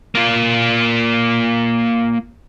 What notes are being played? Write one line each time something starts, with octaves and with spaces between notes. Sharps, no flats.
A#3 F4